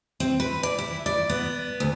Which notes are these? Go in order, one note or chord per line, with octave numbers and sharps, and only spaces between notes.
C4
B4
D5
E4
D5
B3
D2